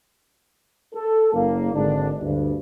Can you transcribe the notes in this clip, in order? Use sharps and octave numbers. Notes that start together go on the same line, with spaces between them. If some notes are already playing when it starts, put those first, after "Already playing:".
A4
F#1 A#3
G#1 D3 D4
D2 G2